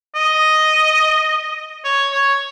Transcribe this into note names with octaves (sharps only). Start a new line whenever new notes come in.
D#5
C#5
C#5